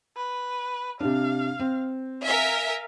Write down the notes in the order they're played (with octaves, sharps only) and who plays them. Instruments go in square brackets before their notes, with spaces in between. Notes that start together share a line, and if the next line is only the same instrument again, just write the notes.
[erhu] B4
[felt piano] C3 D4 [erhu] F5
[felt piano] C4
[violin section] A#4 E5 G#5 [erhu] F5